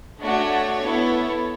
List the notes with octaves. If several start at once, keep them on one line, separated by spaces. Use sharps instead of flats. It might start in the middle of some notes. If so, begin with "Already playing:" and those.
A3 D4 F#4 C#5
B3 E4 A4